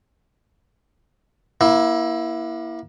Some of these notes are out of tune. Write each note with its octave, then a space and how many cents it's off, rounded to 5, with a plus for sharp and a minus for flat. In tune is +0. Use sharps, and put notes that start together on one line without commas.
A#3 +30 E4 +0